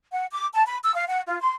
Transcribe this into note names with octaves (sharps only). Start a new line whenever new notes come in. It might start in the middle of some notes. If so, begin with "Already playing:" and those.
F#5
D6
A5
B5
E6
F5
F#5
F4
C6